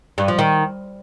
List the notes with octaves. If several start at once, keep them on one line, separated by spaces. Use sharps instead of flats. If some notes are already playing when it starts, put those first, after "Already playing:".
G2
F3
D#3